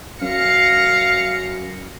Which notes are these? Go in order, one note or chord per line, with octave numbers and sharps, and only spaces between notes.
F#2 F5 A#6 C#7